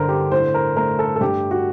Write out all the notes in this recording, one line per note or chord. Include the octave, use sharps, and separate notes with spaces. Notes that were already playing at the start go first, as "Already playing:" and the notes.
Already playing: G2 D3 A#4 C5
G4
A2 C5
A#4
A3 A#4
A4
A4
G2 G4
F#4